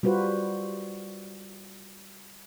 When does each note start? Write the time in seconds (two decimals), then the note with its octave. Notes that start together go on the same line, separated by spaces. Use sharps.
0.03 G3 F4 F#4 B4 C5